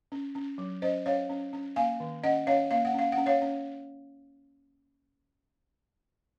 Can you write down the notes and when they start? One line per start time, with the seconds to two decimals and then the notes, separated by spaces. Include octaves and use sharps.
0.12 C#4
0.35 C#4
0.58 F#3
0.82 C#4 C5 D#5
1.06 C#4 C#5 F5
1.29 C#4
1.53 C#4
1.76 A#3 F5 G#5
2.00 D#3
2.24 C#4 D#5 F#5
2.47 C#4 C#5 F5
2.71 A#3 F5
2.85 F#5
2.94 C#4 F5
3.12 F#5
3.18 C#4
3.26 C#5 F5
3.42 C#4